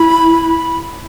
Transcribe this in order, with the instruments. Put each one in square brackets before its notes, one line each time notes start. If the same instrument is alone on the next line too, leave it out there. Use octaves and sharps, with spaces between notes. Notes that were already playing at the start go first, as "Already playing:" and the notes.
Already playing: [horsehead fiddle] E4 [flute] B5